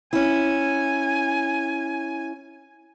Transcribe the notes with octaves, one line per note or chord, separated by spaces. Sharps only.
C#4 E4 G#5